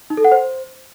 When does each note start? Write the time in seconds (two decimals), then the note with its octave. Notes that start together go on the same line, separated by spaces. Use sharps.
0.10 D#4
0.17 A4
0.24 F#5
0.32 C5